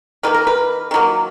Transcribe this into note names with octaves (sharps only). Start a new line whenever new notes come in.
D#3 F#3 A#3 B4
A#4
B4
D#3 F#3 A#3